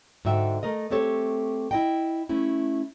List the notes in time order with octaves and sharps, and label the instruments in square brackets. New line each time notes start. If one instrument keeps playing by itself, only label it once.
[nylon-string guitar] G#2 D3 F#4 E5 G5
A3 A#4 D#5
A3 C4 G4 A4 C#5
E4 D#5 G5
A3 C#4 E4